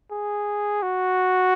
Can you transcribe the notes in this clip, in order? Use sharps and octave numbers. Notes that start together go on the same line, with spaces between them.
G#4
F#4